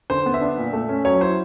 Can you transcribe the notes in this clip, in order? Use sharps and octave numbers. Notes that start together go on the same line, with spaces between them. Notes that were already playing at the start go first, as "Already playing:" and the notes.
D3 C5
B3
E5
D4
A#2
A3
C#4
F#3 C#5
E4 C5